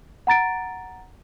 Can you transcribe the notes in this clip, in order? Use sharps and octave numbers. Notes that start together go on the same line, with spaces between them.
F#5 A#5 A6 D7